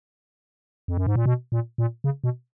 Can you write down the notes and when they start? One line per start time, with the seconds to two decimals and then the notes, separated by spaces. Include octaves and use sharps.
0.88 F2
0.97 F#2
1.06 G#2
1.16 A#2
1.26 B2
1.52 A#2
1.78 A#2
2.04 C#3
2.24 B2